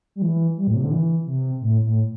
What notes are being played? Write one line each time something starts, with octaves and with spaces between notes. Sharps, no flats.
G3
E3
G3
A2
C3
D3
E3
C3
A2
A2